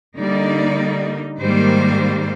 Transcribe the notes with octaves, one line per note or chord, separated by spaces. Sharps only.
D3 G3 A#3 D#4 D5
G#2 D#3 G3 A#3 C5